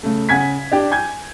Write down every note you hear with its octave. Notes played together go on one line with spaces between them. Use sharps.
C#3 A3
C#3 F#5 G#5 G#6 B6
D4 G4 G5
G#5 G6 G#6